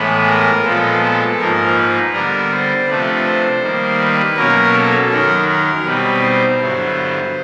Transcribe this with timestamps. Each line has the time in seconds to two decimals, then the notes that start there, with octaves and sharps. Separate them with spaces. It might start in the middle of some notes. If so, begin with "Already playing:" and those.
Already playing: A2 E3 G#3 B3 B4
0.27 A#4
0.64 A#2 F3 G#3 B3 A4
1.02 A4
1.39 G#2 F3 A#3 D#4 A#4
1.76 B4
2.13 D3 G3 B3 D4 A#4
2.51 C5
2.88 C3 F3 A3 D4 B4
3.25 C5
3.62 D#3 G3 A#3
3.99 B4
4.37 B2 F#3 A#3 C#4 A#4
4.74 A4
5.11 F#2 D#3 F#3 A#4
5.49 A#4
5.85 B2 G3 C4 D#4 B4
6.23 C5
6.60 G2 D3 F#3 B3 E4